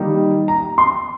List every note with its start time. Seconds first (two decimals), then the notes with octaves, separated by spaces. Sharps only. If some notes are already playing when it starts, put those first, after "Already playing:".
Already playing: D#3 G3 A#3 D#4
0.48 A#5
0.78 C6